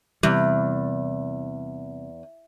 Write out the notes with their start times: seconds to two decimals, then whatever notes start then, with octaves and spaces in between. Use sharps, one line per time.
0.23 E2 C3 G3